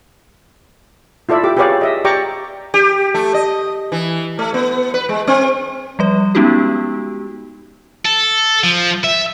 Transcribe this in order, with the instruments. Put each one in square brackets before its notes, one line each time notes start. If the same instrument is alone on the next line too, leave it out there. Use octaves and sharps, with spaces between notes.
[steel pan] E4 F4 A4 D5 E5
G4 D6
G4 G#4 B4 C#5 D5 F5
D#5 E5
G4 D5 G5 A#5 C#6 D6
[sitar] G4
A3
D#5
E3
A3
B3
B4
G#3
C4
[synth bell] F3 G3 B4
G#3 B3 C#4 D#4 F#4 G4
[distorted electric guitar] A4
F3
E5